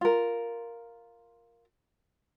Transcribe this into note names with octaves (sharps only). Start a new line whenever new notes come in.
F4 A#4